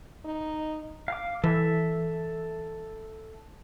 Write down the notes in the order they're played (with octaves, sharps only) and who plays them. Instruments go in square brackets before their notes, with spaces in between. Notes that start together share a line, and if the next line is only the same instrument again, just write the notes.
[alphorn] D#4
[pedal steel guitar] F5 D6
[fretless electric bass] E3 [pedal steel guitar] A4 E5